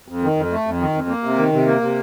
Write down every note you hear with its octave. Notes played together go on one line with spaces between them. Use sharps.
F2
D#3
F2
A3
F2
D#3
F2
A#3
C3
D#3
C3
A#3
C3